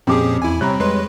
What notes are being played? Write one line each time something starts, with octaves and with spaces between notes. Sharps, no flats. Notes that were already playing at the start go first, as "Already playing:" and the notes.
F2 A#2 F3 C#4 G4 G#4 D6
E2 E4 G#5
C3 G3 C4 C#5 A#5 B5 F#6
F2 G#3 B4 C6